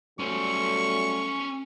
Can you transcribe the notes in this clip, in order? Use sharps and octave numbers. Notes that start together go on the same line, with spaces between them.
F#3 G3 A3 C#4 C5 C#6